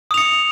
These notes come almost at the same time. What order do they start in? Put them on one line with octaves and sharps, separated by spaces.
D#6 F7 C#7